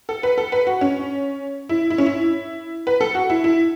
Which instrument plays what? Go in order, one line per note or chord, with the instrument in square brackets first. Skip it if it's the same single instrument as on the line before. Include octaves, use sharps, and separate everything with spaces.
[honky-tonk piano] A4
B4
A4
B4
F#4
C#4
E4
E4
C#4
E4
B4
A4
F#4
E4
E4